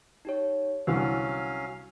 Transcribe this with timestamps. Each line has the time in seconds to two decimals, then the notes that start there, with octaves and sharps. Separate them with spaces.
0.25 D#4 G4 C#5
0.87 C2 D3 E3 F#3 C#4 F5 E6